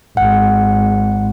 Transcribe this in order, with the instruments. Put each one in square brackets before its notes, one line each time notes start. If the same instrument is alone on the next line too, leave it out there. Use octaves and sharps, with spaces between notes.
[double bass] G#1 [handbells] F#5